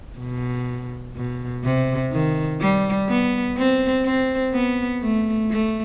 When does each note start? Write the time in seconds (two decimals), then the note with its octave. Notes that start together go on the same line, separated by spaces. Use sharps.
0.19 B2
1.16 B2
1.64 C3
2.12 D#3
2.61 G3
3.09 B3
3.57 C4
4.06 C4
4.53 B3
5.02 A3
5.51 A3